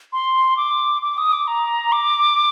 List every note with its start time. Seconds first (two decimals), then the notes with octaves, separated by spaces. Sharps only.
0.13 C6
0.57 D6
1.02 D6
1.18 D#6
1.32 D6
1.47 A#5
1.92 D6